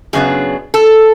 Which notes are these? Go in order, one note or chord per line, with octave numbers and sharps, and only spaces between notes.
F#2 C#3 F#3 B3 D4 G#4
A4